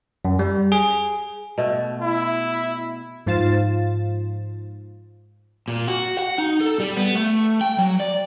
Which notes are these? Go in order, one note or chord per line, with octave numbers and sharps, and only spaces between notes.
F#2
G3
G#4
B2 A3
E4
G#2 F3 F4 F5 A6 E7
A#2
F#4
F#5
D#4
A4
G3
B3
A3
G5
F#3
D5